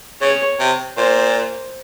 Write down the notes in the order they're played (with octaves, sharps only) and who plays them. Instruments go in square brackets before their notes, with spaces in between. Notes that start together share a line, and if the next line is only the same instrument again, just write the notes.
[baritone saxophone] C#3 [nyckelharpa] C#5
[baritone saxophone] C3
[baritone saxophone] A#2 [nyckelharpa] C5